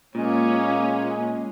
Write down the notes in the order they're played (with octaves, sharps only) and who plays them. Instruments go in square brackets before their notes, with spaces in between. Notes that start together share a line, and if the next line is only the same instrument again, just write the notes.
[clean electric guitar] A#2 [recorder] G#3 [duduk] A#3 [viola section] C#4